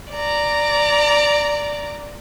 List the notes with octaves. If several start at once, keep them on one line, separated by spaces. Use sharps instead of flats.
D5 A#5